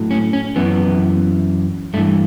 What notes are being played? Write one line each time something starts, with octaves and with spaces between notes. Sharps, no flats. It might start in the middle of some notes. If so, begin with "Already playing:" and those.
Already playing: A2 F#3
C#4
C#4
F#2 E3 B3
G2 E3 A3